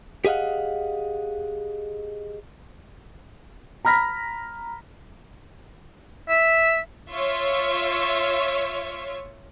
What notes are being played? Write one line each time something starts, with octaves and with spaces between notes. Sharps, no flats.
G4 G#4 D#5 F5 F#5
A#5 B5 F6 A#6 B6
E5
F4 C#5 E5 C#6